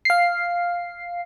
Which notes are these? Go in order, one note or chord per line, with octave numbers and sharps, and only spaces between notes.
F5 C7